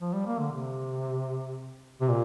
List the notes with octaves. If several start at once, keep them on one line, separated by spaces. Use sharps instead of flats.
F3
G3
A#3
D3
C3
C3
A#2